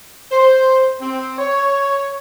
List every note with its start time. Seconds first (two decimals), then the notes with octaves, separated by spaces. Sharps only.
0.32 C5
1.00 C4
1.38 C#5